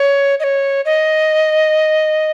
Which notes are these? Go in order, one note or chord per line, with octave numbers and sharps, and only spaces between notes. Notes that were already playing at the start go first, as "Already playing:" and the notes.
Already playing: C#5
D#5
C#5
D#5